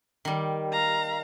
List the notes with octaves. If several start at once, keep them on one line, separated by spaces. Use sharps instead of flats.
D#3 G3
F5 A#5